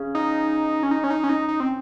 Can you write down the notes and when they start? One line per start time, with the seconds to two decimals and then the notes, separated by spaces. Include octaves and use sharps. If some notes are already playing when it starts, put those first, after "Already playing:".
Already playing: C#3
0.15 D#4
0.83 C#4
0.91 D#4
1.04 C#4
1.10 D#4
1.24 C#4
1.29 D#4
1.48 D#4
1.60 C4